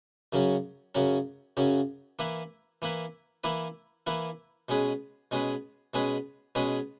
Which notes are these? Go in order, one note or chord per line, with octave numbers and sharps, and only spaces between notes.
F#2 C#3 F#3 C#4
F#2 C#3 F#3 C#4
F#2 C#3 F#3 C#4
E3 A#3 E4 B4
E3 A#3 E4 B4
E3 A#3 E4 B4
E3 A#3 E4 B4
B2 G#3 C#4 G#4 B4
B2 G#3 C#4 G#4 B4
B2 G#3 C#4 G#4 B4
B2 G#3 C#4 G#4 B4